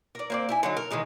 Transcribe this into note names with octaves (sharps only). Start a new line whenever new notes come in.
A#4 D5
A#3 C4 D5
E4 E5 G#5
D3 F#3 D#4
A#4
D#3 E3 G#3 D#4